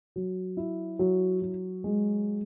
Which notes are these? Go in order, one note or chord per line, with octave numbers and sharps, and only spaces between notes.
F#3
E4
F#3
F#3
G#3